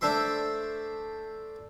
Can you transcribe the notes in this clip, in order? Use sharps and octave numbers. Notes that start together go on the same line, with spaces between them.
A3 D4 C5 E5 C6